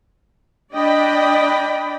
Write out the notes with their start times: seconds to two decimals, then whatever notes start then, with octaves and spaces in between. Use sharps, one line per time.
0.75 D4 D5 D#5 G5 B5